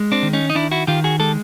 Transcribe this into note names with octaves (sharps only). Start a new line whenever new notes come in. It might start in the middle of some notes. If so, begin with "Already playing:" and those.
Already playing: G#3
C4 D4
D#3
C#4 D#4
D#4
D#3 D4 E4
E4 F#4
D#3 F4 G4
F#4 G#4
G#3 G4 A4